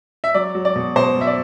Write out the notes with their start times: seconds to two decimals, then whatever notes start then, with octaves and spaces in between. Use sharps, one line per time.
0.24 E5
0.34 F#3 D5
0.55 F#3
0.65 D5
0.76 B2
0.96 B2 C5
1.17 F#3 E5
1.27 D5